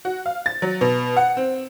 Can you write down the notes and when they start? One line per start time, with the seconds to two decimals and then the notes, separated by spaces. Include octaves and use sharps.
0.05 F#4
0.26 F5
0.46 A6
0.62 F#3
0.81 B2
1.17 F#5
1.37 C4